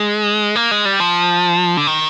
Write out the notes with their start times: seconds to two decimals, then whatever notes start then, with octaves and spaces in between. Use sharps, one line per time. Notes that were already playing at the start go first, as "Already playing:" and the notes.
Already playing: G#3
0.56 A#3
0.71 G#3
0.85 G3
1.00 F3
1.77 D3
1.87 D#3